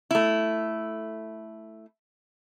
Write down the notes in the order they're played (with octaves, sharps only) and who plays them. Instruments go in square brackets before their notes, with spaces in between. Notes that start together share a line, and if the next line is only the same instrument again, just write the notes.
[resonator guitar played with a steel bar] A3 E4